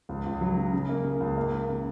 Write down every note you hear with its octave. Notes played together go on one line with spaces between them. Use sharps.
C#2
C#2
F#3
C#3
C#3
A#3
C#3
C#2
A#3
A#3
C#3